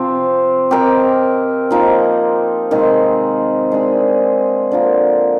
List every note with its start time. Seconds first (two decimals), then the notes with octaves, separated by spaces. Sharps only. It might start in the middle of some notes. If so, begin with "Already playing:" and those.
Already playing: C3 F3 C4
0.71 C4 G4 A#4 D#5
1.71 F3 A#3 D#4
2.71 C3 D#3 G#3 C4
3.72 G#3 D4 G#4
4.72 D3 F3 A#3